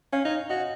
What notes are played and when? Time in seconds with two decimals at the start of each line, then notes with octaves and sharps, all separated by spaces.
0.12 C#4 F5
0.25 D#4
0.50 F#4 D#5